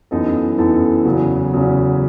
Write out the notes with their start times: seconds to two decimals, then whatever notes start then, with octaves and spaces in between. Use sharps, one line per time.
0.11 F#2 E3 B3 D#4 A4
0.58 F#2 E3 B3 D#4 A4
1.05 E2 C#3 F#3
1.53 E2 C#3 F#3